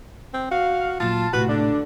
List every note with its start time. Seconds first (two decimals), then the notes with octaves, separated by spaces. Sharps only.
0.34 C4
0.51 F#4 F5
1.00 A#2 F#3 F4 A5
1.33 A2 C3 F#4 B4
1.49 D3 D4